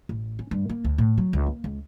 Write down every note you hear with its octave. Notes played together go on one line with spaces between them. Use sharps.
A1
C#4
G2
A#3
D2
A2
F#3
C#2
A#3
C#2